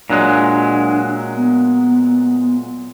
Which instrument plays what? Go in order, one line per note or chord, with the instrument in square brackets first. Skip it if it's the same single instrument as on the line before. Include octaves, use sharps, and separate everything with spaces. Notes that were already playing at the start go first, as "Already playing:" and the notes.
[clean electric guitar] A#2 F#3 G#3 [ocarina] D4
[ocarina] B3